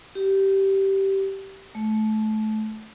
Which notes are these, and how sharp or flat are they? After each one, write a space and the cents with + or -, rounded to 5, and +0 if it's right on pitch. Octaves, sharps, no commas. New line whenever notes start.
G4 -15
A3 -25